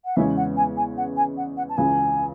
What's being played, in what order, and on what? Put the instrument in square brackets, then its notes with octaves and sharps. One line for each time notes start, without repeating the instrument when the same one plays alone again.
[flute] F#5
[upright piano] E2 C#3 E3 G#3 C#4 [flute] E5
[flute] F#5
G#5
G#5
F#5
G#5
F#5
F#5
A5
[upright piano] C#2 C#3 E3 [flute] G#5